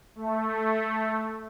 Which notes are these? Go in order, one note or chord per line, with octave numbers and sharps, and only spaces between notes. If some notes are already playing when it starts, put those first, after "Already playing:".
A3